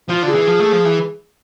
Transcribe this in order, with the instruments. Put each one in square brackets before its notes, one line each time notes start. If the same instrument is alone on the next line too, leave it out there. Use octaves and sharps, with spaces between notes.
[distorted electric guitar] F3 [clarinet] F4
[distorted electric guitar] D3
[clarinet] G#4
[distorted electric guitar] E3
F3
A3
F3
E3